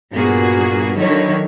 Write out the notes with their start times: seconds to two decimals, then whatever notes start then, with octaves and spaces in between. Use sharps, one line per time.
0.11 G2 A#2 A#3 B3 F#4 G#4
0.97 D3 D#3 F#3 D#4 E4 C#5